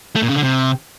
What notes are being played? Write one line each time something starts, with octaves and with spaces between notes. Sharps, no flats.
A3
A#2
C#3
D3
C3